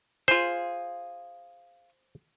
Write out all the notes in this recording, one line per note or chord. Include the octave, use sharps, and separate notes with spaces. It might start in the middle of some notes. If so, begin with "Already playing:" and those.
F4 G#4 C5